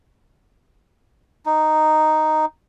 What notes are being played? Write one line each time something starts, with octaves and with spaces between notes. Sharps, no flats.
D#4